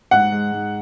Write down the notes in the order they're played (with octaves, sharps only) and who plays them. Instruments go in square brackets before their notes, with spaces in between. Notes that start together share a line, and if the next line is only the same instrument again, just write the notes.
[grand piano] G#2 [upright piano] F#5
[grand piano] G#3
G#2